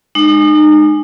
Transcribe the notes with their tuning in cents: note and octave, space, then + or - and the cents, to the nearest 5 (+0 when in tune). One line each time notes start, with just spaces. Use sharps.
G#3 +0 D#4 -35